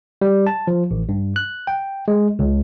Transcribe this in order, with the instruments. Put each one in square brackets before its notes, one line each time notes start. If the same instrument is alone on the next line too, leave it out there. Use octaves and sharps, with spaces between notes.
[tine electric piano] G3
A5
F3
A1
G2
F#6
G5
G#3
C#2